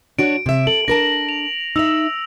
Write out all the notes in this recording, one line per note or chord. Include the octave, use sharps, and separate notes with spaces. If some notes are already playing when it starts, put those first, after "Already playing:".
D4 F#4 C#5 D7
C3 E5
A4 F#7
D4 A#4 A5 A#6
F7
D#4 E5 E6 F7